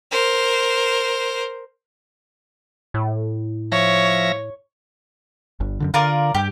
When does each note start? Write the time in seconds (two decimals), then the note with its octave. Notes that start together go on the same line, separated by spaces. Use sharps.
0.11 A#4 C5
2.94 A2
3.72 F3 C#5 E5 A#6
5.60 G1 G2
5.80 F#2 A2 D3
5.94 D3 F4 A#4 D5
6.35 G2 G4